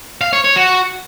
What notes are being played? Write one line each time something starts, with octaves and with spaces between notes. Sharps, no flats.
F5
C#5
C#5
F#4